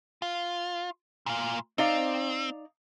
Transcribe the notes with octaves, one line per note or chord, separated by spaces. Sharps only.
F4
A#2 F4
C4 D#4 D5 F5